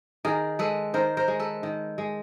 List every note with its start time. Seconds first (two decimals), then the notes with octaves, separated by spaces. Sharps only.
0.25 D#3 G#4 A#4
0.59 G#3 A4 B4
0.94 D#3 A#4 C5
1.17 A#4 C5
1.28 G#3
1.40 A4 B4
1.63 D#3
1.98 G#3